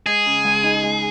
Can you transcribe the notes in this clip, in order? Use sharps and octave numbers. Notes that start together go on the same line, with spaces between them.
G#3 G#4
C#3
C#2
D#4
G#3